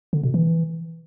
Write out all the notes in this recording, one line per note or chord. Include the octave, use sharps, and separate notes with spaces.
D3
B2
E3